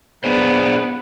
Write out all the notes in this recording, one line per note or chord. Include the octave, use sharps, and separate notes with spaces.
B3 D4 G#4 C5